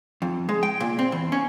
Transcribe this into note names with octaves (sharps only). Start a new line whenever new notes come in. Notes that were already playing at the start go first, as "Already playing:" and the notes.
F2
G#3
G5
A#2
C4
E2
C#4